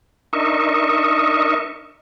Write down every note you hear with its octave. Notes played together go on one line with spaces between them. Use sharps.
D4 D#4 A#4 D#5 E5 C#6